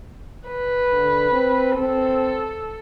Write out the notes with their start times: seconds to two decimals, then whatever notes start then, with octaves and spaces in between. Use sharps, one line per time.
0.49 B4
0.92 D3
1.31 C4
1.78 C4 A4